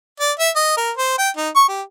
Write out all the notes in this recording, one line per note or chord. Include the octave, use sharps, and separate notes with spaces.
D5
E5
D#5
A#4
C5
G5
D#4
C#6
G4